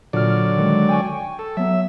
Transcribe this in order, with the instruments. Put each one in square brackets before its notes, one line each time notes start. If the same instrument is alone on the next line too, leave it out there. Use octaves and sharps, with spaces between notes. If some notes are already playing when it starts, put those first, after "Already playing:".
[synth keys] A#2 F6 [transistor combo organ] D3 F#3 D5
[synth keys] D#3 G#3
G5 G#5 C#6
[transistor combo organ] A4
[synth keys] F#3 B3 [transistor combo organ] E5